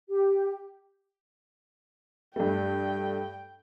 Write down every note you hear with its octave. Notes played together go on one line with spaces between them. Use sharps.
G4
G2 A3 G5